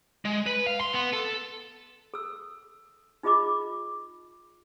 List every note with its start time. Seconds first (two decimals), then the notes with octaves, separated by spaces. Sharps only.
0.25 G#3
0.46 B4
0.67 F5
0.81 C6
0.93 B3
1.13 A4
2.14 A4 E6
3.23 D#4 F4 G#4 D#5 B5 D6